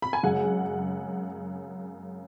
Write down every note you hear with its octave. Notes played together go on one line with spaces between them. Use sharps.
B5
G#5
F#2 C#3 G#3 F#5